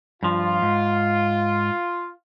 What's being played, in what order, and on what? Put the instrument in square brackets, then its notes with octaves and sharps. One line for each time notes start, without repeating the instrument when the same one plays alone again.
[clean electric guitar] G2 F3 [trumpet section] F4
[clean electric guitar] G#2